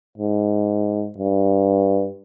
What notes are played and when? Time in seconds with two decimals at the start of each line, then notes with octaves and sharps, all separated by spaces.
0.18 G#2
1.18 G2